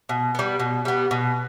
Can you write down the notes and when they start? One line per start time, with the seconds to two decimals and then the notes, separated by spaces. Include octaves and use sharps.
0.09 B2
0.35 G3 B3
0.59 B2
0.85 G3 B3
1.11 B2